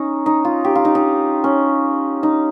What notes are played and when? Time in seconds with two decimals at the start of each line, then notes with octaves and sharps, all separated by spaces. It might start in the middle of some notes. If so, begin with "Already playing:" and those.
Already playing: C#4 D#4
0.26 D#4
0.45 F4
0.65 G4
0.75 F4
0.85 D#4
0.95 D#4
1.44 C#4
2.23 D#4